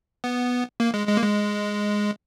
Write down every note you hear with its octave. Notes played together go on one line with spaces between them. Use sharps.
B3
A#3
G#3
G#3
A#3
G#3